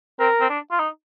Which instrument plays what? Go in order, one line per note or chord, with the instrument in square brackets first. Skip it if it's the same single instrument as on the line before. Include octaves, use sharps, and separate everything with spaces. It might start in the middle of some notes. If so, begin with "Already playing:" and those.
[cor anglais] C4 [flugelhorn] A#4
[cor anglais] C4
D4
F4
D#4